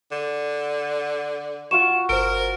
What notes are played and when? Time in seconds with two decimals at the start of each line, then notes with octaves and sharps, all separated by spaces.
0.12 D3
1.71 F4 F#4 C#6 E7
2.09 G1 A#4 C5 D7